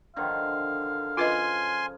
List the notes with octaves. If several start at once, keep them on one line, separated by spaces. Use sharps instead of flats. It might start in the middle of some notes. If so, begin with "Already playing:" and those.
D3 D#3 F3 F5
C#3 F3 F4 B4 D#5 G#5 C6